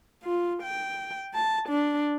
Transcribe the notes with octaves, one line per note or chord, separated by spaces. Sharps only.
F4
G5
A5
D4